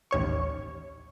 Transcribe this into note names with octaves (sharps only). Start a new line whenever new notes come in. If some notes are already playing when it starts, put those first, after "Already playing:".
A1 D#2 C#5 C#6